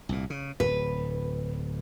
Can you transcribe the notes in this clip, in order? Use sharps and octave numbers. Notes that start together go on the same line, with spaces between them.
C2 A#2
C#3
D1 B4